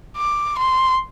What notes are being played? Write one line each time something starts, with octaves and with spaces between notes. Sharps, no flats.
D6
C6